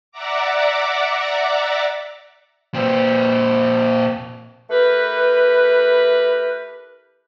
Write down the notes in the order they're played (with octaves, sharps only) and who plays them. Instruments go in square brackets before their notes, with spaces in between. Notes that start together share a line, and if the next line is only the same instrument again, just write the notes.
[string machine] D5 E5 F#5 A#5 D6
[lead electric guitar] A#2 C4
[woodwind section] A3 E4 G4 A#4 B4